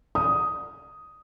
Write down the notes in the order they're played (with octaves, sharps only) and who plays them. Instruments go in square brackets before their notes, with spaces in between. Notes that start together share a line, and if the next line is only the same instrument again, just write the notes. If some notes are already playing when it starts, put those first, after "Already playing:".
[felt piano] D#6